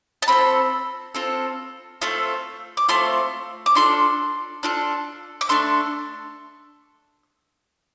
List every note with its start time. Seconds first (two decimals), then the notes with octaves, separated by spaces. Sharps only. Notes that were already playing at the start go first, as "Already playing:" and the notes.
0.22 A5
0.28 C4 F4 A4 B5
1.15 C4 F4 A4
2.02 A3 C4 F4 A4
2.77 D6
2.89 A3 C4 F4 A4 C6
3.66 D6
3.75 D4 F4 A4 C6
4.63 D4 F4 A4
5.41 D6
5.49 A3 D4 A4 C6